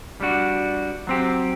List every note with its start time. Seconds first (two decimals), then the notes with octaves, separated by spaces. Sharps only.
0.20 G3 D4 F#4
1.07 F#3 C4 G4